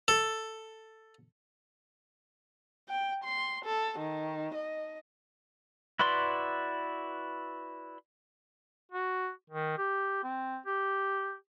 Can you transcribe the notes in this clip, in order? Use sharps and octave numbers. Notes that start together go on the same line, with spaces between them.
A4
G5
C6
A4
D#3
D#5
E4 F#4 B4 D5 C6
F#4
D#3
G4
C4
G4